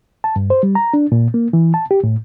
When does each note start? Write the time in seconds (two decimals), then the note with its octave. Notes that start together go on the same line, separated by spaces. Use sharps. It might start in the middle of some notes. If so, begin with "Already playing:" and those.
0.24 A5
0.36 G2
0.50 C5
0.63 G3
0.75 A#5
0.94 D4
1.12 A#2
1.34 A#3
1.53 E3
1.74 A5
1.91 G4
2.04 A2